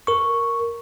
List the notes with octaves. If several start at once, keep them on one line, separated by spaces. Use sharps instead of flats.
A#4 C#6